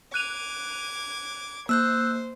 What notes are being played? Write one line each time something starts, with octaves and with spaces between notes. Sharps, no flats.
D6 F#6 G#6 D#7 F7
A#3 C5 E6 F#6 G6